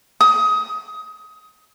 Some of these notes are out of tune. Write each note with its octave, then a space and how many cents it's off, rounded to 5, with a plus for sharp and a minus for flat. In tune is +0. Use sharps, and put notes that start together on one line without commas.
D#6 +20